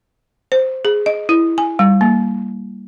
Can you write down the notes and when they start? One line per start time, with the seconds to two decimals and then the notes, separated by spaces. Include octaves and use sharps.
0.52 C5
0.85 G#4
1.06 D#5
1.29 E4
1.58 G#5
1.79 G3
2.01 A#3